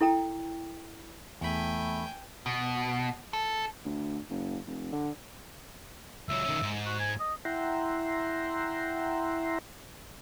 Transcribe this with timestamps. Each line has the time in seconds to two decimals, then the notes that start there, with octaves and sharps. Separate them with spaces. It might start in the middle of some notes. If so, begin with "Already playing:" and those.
0.01 E4 A4 G5 A#5
1.41 E2 A3 G5 G#5 B5
2.46 B2
3.33 A4
3.85 D2
4.30 F#1
4.67 F1
4.92 D3
6.29 C#2 F#3 E5
6.45 D#3 C#4
6.63 G#2
6.86 F#4
7.00 G#5
7.20 D#5
7.45 E4 E5 F#5 G5 A#5 C6